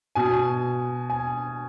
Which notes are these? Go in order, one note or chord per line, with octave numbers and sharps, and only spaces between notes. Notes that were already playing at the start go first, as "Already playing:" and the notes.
B2 G#5
G#5